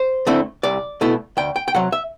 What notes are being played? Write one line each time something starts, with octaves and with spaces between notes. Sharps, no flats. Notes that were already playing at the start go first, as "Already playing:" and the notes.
Already playing: C5
D3 A3 C4 E4
C2 D5
B2 A3 E4
D2 G5
G5
G5
C3 F#3 F#5
E5